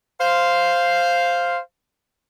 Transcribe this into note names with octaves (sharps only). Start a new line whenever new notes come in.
C5 F5